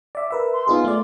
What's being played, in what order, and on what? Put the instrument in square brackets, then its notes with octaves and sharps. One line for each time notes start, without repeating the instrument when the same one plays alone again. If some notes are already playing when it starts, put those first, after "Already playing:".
[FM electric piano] D5 E5
A#4 B4 E5
[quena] C6
[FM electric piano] B3 D#4 G#4 [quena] F4
[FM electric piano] A3 D5